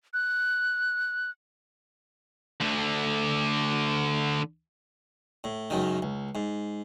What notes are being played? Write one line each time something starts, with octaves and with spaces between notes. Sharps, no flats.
F#6
D2 D3
A2
C#2 F#2 D#3
C#2
G#2